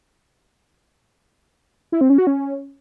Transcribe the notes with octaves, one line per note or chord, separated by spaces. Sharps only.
E4
C4
C#4
F#4
C#4